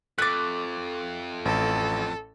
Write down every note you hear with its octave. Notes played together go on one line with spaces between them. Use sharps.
F2 A3 D6 F#6 A6
A1 A4